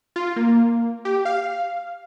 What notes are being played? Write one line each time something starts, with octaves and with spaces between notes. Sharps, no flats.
F4
A#3
G4
F5